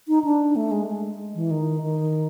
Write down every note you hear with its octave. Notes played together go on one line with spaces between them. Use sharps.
D#4
D4
A3
G#3
G#3
E3
D#3
D#3